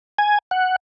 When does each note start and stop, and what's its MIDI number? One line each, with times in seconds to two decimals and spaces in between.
0.18 0.39 80
0.51 0.76 78